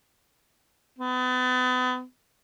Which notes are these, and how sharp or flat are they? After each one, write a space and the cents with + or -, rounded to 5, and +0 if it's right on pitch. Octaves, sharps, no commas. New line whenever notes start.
B3 +35